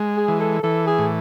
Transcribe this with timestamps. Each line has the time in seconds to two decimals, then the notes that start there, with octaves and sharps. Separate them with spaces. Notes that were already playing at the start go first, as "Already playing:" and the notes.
Already playing: G#3
0.17 G#4
0.28 E3
0.40 A4
0.63 E3 A4
0.87 G#4
0.99 A2